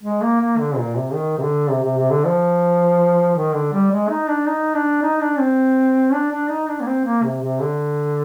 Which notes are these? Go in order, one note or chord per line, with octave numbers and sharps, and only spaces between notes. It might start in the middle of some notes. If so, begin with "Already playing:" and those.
G#3
A#3
A#3
D3
A#2
C3
D#3
C3
D3
C3
C3
C3
D3
F3
D#3
D3
G3
G#3
D#4
D4
D#4
D4
D#4
D4
C4
D4
D4
D#4
D4
A#3
C4
A#3
C3
C3
D3